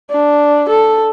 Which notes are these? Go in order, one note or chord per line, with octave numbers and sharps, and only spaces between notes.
D4
A4